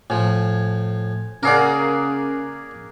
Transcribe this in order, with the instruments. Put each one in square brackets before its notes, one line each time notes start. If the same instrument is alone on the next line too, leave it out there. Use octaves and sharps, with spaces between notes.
[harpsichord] A2 F3 [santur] G#5
[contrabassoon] C#3 [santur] A#3 G#4 F#5 [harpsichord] A#4 C#5 D5